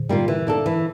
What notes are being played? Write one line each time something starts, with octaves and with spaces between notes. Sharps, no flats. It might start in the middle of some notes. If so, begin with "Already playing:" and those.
Already playing: A#2 D3
G3 A#3 F4
E3
A#3 D4 A4
E3